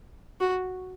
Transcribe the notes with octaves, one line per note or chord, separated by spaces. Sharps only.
F#4